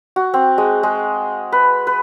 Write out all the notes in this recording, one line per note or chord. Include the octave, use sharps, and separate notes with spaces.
F#4
C4
G#3
G#3
B4
B4